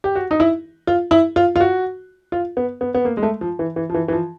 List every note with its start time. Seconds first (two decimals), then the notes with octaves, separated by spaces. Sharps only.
0.04 G4
0.15 F#4
0.31 D#4
0.40 E4
0.87 F4
1.11 E4
1.36 F4
1.56 F4
1.60 F#4
2.32 F4
2.57 B3
2.81 B3
2.94 B3
3.05 A#3
3.17 G#3
3.23 A3
3.41 F3
3.59 E3
3.76 E3
3.90 F3
3.94 E3
4.08 E3
4.12 F3